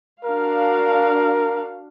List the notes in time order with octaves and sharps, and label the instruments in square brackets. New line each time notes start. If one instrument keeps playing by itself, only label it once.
[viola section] D4 F#4 F5 [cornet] A#4